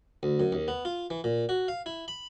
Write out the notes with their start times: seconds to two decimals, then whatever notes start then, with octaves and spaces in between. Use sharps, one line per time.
0.23 D2
0.40 F#2
0.52 D#2
0.68 B3
0.85 F4
1.10 E3
1.24 A#2
1.49 F#4
1.68 F5
1.86 E4
2.08 B5